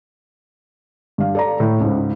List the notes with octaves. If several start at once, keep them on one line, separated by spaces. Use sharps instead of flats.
G2 F5
A4 D5 A#5
A2
C#2 G#2